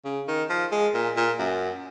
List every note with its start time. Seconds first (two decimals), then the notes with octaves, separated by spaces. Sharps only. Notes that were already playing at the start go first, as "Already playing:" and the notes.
0.05 C#3
0.28 D#3
0.50 F3
0.72 G#3
0.94 A#2
1.17 A#2
1.39 F#2